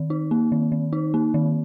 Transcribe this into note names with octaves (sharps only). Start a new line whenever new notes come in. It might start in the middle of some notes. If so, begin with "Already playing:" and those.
Already playing: D#3
D#4
A#3
D#3
D#3
D#4
A#3
D#3